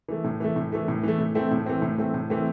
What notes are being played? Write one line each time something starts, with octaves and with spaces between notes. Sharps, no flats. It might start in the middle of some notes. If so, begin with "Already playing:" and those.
E3 A3
A2
E3 A3
A2
E3 A3
A2
E3 A3
A2
E3 A3 C4
A2
E3 A3 C4
A2
E3 A3 C4
A2
E3 A3 C4